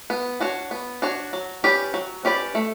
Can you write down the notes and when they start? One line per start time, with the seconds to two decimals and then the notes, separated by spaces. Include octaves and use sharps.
0.10 B3
0.40 D4 F#4 C#5
0.71 B3
1.02 D4 F#4 C#5
1.33 F#3
1.64 C#4 G4 B4 D5
1.94 F#3
2.25 C#4 G4 B4 D5
2.55 A3